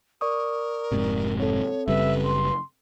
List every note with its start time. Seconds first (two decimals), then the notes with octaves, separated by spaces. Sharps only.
0.21 A#4 D5 C#6 D#6
0.92 F1 G#2 C3
1.39 C4 A4 C#5
1.88 F#1 C#3 G3 B4 E5
2.25 C6